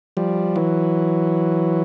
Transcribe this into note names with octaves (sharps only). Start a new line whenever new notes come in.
F3 G3
E3 F#3